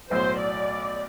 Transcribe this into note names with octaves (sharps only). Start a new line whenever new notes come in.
B1 A2 F#3 C5
D5